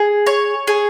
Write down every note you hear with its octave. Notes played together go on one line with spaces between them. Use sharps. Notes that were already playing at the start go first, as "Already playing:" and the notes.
Already playing: G#4
C#5
G#4